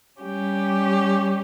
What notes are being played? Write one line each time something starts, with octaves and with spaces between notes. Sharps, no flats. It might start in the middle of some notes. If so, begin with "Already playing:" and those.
G3 C#4 G4